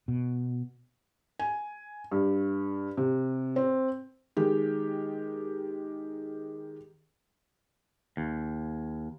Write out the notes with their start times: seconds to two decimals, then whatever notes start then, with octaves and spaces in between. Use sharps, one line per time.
0.08 B2
1.39 G#5
2.12 G2
2.97 C3
3.56 C4
4.37 D#3 G#3 G4
8.17 D#2